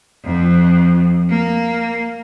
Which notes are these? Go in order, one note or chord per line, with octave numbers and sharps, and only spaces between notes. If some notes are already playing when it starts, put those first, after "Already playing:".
F2
A#3